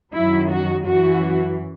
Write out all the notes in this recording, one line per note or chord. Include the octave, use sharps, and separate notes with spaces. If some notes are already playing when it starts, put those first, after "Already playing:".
F#2 D#3 F#3 E4
F#4
F#2 E3 F#4